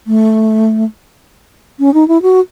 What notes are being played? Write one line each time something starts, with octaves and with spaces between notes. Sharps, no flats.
A3
C#4
D#4
E4
F#4